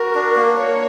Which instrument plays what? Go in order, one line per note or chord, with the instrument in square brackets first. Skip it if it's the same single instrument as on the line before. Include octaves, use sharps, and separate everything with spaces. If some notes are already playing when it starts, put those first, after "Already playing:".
Already playing: [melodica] F#4 [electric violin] A#4
[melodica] D4
A#3
[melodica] A#3 [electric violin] C#5